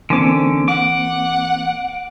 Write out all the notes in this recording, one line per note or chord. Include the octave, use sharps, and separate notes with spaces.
D3 E3 A#3 C4 C#4 D6
F#5 D6